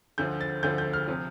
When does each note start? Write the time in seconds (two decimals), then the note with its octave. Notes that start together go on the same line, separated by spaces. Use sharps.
0.18 D2 D3 F3 G6
0.41 A6
0.63 D2 D3 F3 G6
0.78 G6
0.93 F6
1.08 C3 F3